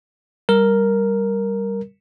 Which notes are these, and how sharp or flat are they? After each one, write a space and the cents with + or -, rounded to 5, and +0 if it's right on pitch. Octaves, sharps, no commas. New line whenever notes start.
G3 +0 A#4 +0